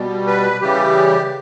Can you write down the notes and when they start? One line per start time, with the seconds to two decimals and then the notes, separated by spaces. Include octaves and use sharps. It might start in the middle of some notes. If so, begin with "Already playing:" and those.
Already playing: B2 G3
0.27 B4
0.61 C#3 E3 G3 G4